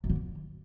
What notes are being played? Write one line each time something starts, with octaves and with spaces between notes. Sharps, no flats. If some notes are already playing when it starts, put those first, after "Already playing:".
F#2
D3
F2